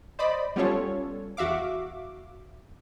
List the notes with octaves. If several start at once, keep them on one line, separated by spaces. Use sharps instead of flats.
C5 D5 D#5 B5
G3 B3 C#4 F4 A4 C#5
E2 F#4 E5 F5 D6